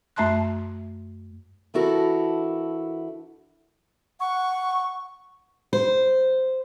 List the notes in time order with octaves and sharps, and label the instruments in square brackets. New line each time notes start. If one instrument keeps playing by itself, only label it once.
[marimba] F#2 A3 E5 A5 C6 F#6
[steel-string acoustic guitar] E3 D4 E4 F#4 A4 A#4
[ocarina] F#5 [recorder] C#6
[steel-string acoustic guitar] C5